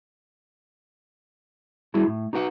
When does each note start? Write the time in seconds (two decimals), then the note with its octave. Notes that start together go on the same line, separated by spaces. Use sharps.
1.94 G3 E4 F#4 G#4
2.07 A2
2.33 D#4 F#4 B4 F#5